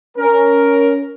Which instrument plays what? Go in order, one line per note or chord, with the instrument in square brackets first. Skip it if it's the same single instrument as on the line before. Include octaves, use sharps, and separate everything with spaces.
[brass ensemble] C#4 A#4